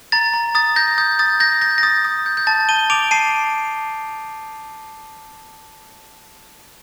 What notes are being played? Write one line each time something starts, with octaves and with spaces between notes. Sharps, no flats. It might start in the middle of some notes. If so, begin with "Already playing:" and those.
A#5 A6
A#5
D#6 A6
G6 A#6
D#6 G6
D#6 A6
G6 A#6
G6 A#6
A#6
D#6 A6
D#6
G6
G6
A5 A6
A5 D#7 G7
D6 D7 F7
A5 C7 D#7